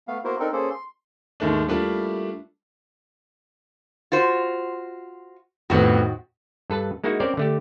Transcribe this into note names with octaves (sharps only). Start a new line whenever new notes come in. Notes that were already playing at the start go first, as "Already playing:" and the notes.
A3 B3 F5
A#3 B3 E4 F#4 A#4 C5
C4 D4 D#4 A4 A#4
A#3 C#4 G#4 A4 C5
C6
D#2 G#2 D#3 A3 D4
G3 A3 A#3 D4 E4 F4
F4 F#4 C5
F2 A2 D#3 B3 F#4
G2 A4 B4 A5
G#3 A#3 D#4 E4 F#4
C4 C#4 A#4 C5 D5
D3 A3 G4